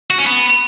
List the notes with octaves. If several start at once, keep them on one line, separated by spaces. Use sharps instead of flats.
F#4
C#4
B3